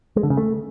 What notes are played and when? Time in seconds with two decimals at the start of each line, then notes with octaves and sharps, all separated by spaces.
0.16 G#3
0.23 D3
0.30 C#3
0.37 A3